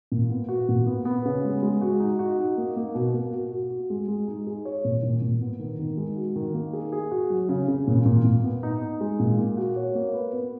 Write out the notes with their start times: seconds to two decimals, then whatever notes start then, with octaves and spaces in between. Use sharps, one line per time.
0.12 A#2
0.30 B3
0.49 F#4
0.69 A#2
0.87 B3
1.05 B3
1.25 C#3
1.44 G#3
1.63 G#3
1.81 F#4
2.00 D#4
2.19 F#4
2.39 D#4
2.57 A#3
2.76 A#3
2.95 B2
3.14 A#3
3.33 F#4
3.52 F#4
3.70 F#4
3.90 G#3
4.08 G#3
4.28 D#4
4.47 G#4
4.65 C#5
4.85 A#2
5.03 A#2
5.21 A#2
5.42 B3
5.59 D#3
5.79 D#3
5.97 G#3
6.17 F#4
6.36 D#3
6.54 A#3
6.73 G#4
6.92 G#4
7.11 F#4
7.30 F#3
7.49 C#3
7.68 C#3
7.87 A#2
8.05 A#2
8.24 A#2
8.44 B3
8.63 D#4
8.81 D#4
9.01 G#3
9.20 A#2
9.38 A#3
9.57 F#4
9.76 C#5
9.95 A#3
10.13 B4
10.33 B3